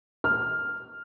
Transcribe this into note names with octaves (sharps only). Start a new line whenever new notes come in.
F6